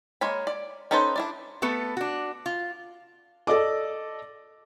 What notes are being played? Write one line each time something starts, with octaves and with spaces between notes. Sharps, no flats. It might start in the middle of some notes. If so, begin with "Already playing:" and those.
G#3 A#3 C#5 B5
D5
C#4 D#4 A4 B4 C5
D4 E4 D5
A3 B3 A4 B4
D4 F#4
F4
A4 D5 D#5 D6